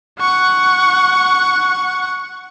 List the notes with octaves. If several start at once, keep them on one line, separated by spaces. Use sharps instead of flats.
F#5 C#6